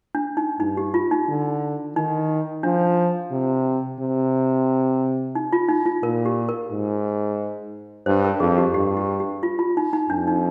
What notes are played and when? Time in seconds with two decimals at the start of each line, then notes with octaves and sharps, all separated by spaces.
0.15 D4
0.37 D#4
0.60 G2 D#4
0.77 G4
0.94 F4
1.11 D#4
1.28 D3
1.96 D#3 D#4
2.63 F3 D4
3.31 C3
4.00 C3
5.35 D#4
5.53 F4
5.69 D#4
5.86 F4
6.03 A#2 A#4
6.25 G4
6.49 A#4
6.71 G#2
8.06 G2 C5
8.24 A#4
8.40 F2 G#4
8.58 G4
8.74 G2 G4
8.97 G4
9.20 G4
9.43 F4
9.59 F4
9.77 D#4
9.93 D#4
10.10 F2 D4
10.27 D#4